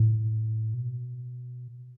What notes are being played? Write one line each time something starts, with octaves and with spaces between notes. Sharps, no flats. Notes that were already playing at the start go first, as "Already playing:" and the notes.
Already playing: A2
B2